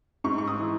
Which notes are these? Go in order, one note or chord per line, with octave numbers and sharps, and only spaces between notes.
G#2 C#6
C#6
D#6
E3